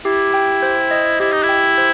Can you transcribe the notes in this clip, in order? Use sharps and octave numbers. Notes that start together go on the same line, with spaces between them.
E4 G4
G5
C5
D#5
E4 G4
D#4
E4
G5
C5